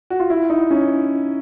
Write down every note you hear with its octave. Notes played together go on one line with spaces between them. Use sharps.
F#4
F4
E4
D#4
C#4